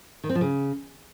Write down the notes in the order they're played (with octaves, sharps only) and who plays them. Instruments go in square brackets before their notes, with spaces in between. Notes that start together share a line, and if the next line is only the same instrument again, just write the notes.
[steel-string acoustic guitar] D#3
C4
F3
C#3